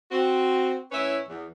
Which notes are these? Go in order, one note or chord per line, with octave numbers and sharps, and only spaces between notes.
C4 F#4
A2 C#4 E4 B4 C#5 E5
E2